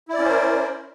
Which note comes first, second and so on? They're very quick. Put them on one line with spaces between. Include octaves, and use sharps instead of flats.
E4 D5 C#4 C5 A#4